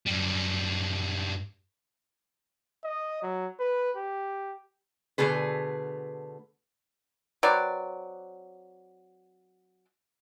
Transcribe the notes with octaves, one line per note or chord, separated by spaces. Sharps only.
F#2 G3
D#5
F#3
B4
G4
B2 D3 G#3 A3 G#4 B4
F#3 C4 B4 D5